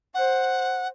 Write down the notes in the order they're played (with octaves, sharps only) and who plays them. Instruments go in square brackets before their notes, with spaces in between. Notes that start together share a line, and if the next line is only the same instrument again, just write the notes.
[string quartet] C5 [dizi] F#5